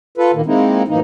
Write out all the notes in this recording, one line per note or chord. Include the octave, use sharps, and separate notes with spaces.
F4 A4 B4
A#2 D#3 A#3
G#3 A#3 C4 D#4 E4
F#2 A2 E3 A#3 D#4